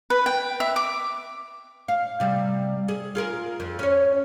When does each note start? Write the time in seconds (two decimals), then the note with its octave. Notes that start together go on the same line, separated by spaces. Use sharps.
0.10 B4
0.26 G5
0.60 E5
0.76 D6
1.88 F5
2.20 C3 G3
2.88 G#4
3.15 F4 G#4 A#4
3.60 F2
3.79 C#4 C#5